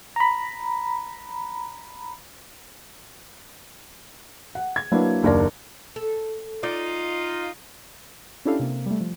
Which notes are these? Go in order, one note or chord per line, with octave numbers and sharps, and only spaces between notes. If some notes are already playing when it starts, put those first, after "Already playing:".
A#5 B5
F#5
G#6
F#3 A#3 D4 E4 B4
F#1 D#2 D4 A#4 D5
A4
D#4 F4 D5
C#4 D4 E4 G4 A4 F5
C3 A#3
G3 A3
F3